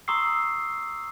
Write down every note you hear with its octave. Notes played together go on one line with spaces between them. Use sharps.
A#5 C6 C#6 D#6 E6 C7